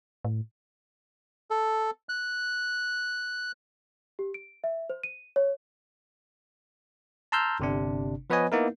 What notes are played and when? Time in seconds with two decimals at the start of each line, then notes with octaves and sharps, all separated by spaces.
0.25 A2
1.51 A4
2.09 F#6
4.19 G4
4.34 D7
4.64 E5
4.90 C5
5.03 D#7
5.36 C#5
7.32 A5 A#5 C6 E6 F6 G6
7.60 G1 C3 D4
8.30 F3 B3 B4 C#5 D#5 G#5
8.52 A#3 B3 D#4 E4 A#4